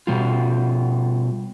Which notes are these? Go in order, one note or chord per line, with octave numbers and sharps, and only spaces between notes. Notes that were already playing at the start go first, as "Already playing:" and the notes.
B2 G3 F4